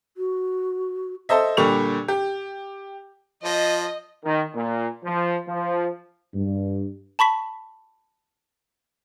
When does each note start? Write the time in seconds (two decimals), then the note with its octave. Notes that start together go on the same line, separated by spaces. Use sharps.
0.17 F#4
1.29 A4 C5 D#5 E5
1.57 A#2 D3 G3 G4 C#6 F7
2.08 G4
3.44 F3 D#5
4.24 D#3
4.55 A#2
5.04 F3
5.47 F3
6.34 G2
7.19 A5 B5 C#6 B6